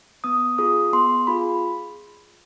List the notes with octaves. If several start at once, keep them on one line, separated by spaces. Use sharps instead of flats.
B3 D#6
F4 G#4 D#6
B3 C6
F4 G#4 B5